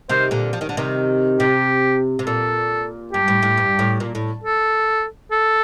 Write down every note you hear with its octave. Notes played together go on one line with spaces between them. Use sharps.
C3 D#3 C5
A#2 D3
F3
D#3
D3
C3 D#3
C3 G4
C3
A#2 A4
G2 G4
A2
A2
G2
A2
A#2
A2
A4
A4